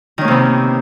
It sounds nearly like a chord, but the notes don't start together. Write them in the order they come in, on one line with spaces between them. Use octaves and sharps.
D#3 C#4 A#3 C3 B3